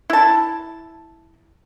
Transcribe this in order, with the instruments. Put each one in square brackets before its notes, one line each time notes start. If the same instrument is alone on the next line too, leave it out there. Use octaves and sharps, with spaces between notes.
[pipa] E4 A5